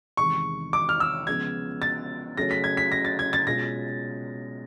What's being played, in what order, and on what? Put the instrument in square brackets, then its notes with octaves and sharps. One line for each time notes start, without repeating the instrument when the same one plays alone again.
[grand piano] E2 C3 D#3 G#3 [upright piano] C#6
[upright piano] D6
F6
E6
[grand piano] C#3 F3 G#3 B3 [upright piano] G#6
[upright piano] A6
[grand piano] C#3 F#3 A3 C#4 [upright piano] A#6
[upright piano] B6
G#6
B6
A#6
A6
G#6
A6
[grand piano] B2 G#3 C#4 F4 [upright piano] A#6